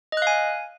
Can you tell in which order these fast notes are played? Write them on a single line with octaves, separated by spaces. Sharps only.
D#5 F#6 F5 G#5